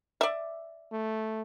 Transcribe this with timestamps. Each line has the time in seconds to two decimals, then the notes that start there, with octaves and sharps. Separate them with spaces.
0.21 D5 E5
0.92 A3